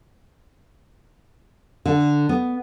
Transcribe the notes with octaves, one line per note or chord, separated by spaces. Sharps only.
D3
B3